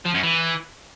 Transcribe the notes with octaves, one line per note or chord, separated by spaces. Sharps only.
F3
F#2
E3